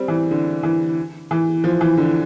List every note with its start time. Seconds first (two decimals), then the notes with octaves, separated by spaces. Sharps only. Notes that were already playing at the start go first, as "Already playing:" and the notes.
Already playing: G3 C4
0.08 E3
0.31 D3
0.63 E3
1.31 E3
1.64 F3
1.81 E3
1.97 D3